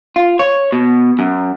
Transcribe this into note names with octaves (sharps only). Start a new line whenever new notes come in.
F4
C#5
B2
F#2